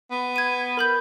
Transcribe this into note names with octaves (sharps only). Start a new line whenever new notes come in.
B3
G#6 D#7
A#4 B5 G6